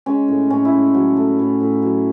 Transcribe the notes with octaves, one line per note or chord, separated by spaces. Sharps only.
G#3 C#4
A2
A2 C#4
E4
G#3
F#3
A3
A2
A2
F#3